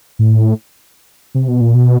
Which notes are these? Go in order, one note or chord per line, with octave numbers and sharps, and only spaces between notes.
A2
C3
B2
A#2
B2